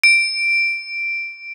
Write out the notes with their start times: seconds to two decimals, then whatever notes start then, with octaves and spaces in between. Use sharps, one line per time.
0.04 D7